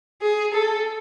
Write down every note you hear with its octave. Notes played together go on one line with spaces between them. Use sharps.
G#4
A4